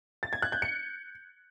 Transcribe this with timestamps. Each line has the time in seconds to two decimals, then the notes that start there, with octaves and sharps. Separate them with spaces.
0.23 A6
0.33 G#6
0.42 F#6
0.52 G6
0.62 C#7